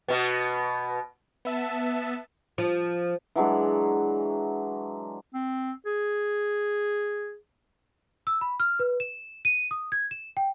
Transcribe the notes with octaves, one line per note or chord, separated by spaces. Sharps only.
B2 B3
B3 E5 A5
F3
E3 F#3 G#3 D4
C4
G#4
E6
B5
F6
B4
E7
D#7
D#6
G#6
E7
G5